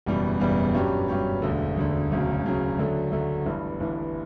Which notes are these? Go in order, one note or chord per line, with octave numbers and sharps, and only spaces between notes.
F#1 E2 B2 G3
F#1 E2 B2 G3
G2 F#3 C#4 G4
G2 F#3 C#4 G4
E1 D2 D3
E1 D2 D3
E1 D2 C#3 F#3
E1 D2 C#3 F#3
D2 D3 F#3 A3
D2 D3 F#3 A3
G1 G2 E3
G1 G2 E3